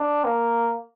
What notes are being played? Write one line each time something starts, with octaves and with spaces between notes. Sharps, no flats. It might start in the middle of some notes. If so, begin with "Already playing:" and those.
Already playing: D4
A#3